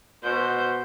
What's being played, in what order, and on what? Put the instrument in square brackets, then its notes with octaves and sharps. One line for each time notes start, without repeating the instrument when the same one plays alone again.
[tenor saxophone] B2 [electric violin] C5 G6